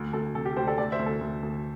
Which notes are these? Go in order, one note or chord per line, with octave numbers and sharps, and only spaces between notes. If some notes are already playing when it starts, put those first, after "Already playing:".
Already playing: D2
D2 A4
C3 A4
G4
D2 G4 C5
A4 D5
D2 A4 D5
C5 E5
D2
A4
D2
D2